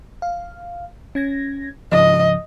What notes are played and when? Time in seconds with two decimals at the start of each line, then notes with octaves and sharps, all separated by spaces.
0.22 F5
1.15 C#4 G#6 A#6
1.92 G#2 C#3 F3 D#5